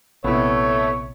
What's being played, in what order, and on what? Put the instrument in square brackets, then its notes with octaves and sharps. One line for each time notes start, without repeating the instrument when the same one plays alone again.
[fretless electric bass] A#1 C3 [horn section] A3 [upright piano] B3 E4 [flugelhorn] C#5